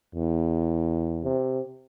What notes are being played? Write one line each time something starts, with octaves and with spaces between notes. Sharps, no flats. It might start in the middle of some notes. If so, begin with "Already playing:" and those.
E2
C3